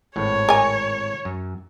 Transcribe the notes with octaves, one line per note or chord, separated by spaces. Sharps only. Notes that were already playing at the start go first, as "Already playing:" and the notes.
G#1 A2 C#5
A#4 G#5
F#2